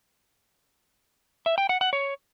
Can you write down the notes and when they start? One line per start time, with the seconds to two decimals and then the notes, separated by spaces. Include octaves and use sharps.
1.46 E5
1.58 G5
1.69 F#5
1.81 F#5
1.93 C#5